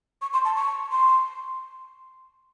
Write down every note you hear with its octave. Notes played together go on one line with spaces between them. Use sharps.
C#6
C6
A5
C#6
C6